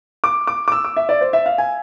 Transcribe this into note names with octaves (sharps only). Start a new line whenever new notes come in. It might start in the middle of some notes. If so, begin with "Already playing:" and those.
D6
D6
D6
E6
D6
E5
D5
C5
E5
F5
G#5